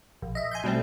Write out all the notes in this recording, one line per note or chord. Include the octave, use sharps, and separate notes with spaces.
A#1
D#5 E5
G#5 C6 G6
B2 G3 A3 C4